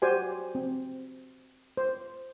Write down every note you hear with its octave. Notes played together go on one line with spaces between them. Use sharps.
F#4 G4 C5 D5 G#5
C4
C5